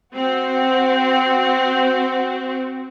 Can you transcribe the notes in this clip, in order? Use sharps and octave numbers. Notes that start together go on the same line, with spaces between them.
C4 F#4